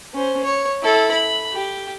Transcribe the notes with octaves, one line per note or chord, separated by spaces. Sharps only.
C#4 C5
C#5
E4 A4
B5
G4